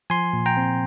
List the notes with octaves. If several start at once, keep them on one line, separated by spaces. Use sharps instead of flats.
F3 G#5 C6
A#2
G5 A#5
C4